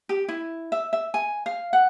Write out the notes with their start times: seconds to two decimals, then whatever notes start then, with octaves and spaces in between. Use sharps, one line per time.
0.09 G4
0.29 E4
0.72 E5
0.93 E5
1.14 G#5
1.46 F5
1.73 F#5